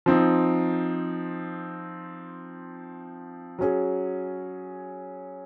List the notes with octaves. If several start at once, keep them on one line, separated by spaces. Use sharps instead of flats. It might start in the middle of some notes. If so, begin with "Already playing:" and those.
F3 C4 D#4
F#3 C#4 G#4